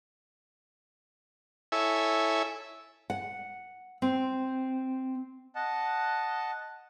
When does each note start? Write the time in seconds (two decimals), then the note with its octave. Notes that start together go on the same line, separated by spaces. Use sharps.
1.72 E4 A4 C#5 E5 G#5
3.10 F#5
4.02 C4
5.55 D#5 F#5 A5